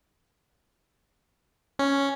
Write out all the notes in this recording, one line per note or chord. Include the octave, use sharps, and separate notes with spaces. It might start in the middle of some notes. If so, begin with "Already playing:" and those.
C#4